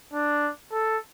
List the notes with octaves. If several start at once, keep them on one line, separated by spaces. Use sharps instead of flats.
D4
A4